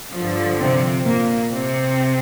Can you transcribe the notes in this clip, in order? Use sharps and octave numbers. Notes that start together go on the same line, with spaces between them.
G2 D3 F3
C3 C4
A#2 A#3
C3 C4